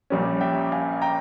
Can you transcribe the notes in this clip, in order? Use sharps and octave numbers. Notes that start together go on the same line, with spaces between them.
A#1 A#2 G3 C#4
E5 G5
F5 G#5
G5 A#5